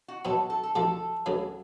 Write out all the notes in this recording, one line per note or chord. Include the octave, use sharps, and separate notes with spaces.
F#4
B2 F#3 B3 A4
A4
A4
D2 C3 F3 A4
D2 C#3 F#3 B3